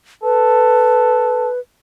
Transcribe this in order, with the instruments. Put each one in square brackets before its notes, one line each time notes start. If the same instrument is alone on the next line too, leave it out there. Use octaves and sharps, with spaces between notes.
[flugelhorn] A4 [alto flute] B4